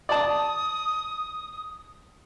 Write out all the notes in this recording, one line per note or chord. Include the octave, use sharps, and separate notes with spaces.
D5 A5 D#6